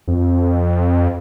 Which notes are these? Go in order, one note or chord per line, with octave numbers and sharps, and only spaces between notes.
F2